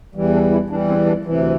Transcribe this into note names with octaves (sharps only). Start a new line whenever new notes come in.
E2 E3 G3
D4
E4
E2 E3 G3 D4
C4
D4
D2 C3 E3